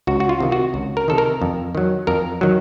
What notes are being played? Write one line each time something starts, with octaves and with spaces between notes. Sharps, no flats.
C#2 F#4
F#4
F4
C3 D#3
F#4
C#2
A#4
C3 D#3 A4
A#4
F2
D#3 F#3
F2 A#4
D#3 F#3